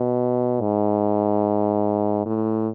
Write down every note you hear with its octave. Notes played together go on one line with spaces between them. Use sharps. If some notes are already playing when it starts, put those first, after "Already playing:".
Already playing: B2
G#2
A2